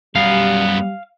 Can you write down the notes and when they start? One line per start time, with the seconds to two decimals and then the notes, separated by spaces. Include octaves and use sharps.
0.16 F#2 G3 B3 F5